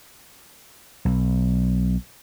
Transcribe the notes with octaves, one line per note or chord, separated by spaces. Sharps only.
B1